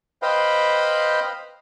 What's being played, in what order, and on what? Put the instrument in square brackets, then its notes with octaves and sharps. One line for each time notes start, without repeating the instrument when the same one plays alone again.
[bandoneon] B4 C5 D#5 F5 G5 B5